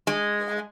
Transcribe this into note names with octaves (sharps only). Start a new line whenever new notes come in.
G#3